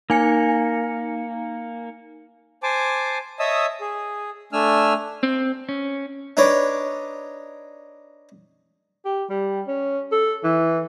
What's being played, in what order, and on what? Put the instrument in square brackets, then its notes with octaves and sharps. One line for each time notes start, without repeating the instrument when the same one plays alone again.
[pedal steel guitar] A#3 [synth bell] D#4 G#5 C#7
[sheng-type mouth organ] C5 G#5 A5 D6
C#5 D#5 E5 A5 D#6 E6
G#4
A3 D4 G#5 E6 F6
[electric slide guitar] C4
C#4
[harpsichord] D4 D#4 B4 C#5 D5
[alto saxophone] G4
G3
C#4
A4
E3